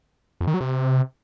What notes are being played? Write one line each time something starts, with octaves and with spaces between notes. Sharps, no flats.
F2
D#3
F#3
C3